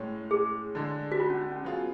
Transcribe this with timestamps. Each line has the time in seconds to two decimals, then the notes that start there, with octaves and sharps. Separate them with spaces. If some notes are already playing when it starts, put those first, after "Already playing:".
Already playing: A2 G#3 C#4
0.31 G#4
0.75 D3 G#3 D4
1.12 F#4
1.20 F4
1.30 C#4
1.41 C#4
1.52 C#4
1.63 F#3 B3 F4 G#4